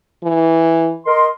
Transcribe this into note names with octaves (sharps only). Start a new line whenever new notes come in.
E3
A#4 D#5 C6